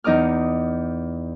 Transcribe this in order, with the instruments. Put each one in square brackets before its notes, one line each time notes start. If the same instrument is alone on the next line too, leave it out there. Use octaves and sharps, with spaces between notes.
[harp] E2 D#4 D#5 D6 F6